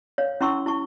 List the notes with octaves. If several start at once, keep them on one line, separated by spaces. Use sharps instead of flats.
C#5 F5
C#4 E4 C6 C#6 E6
E4 A5 C#6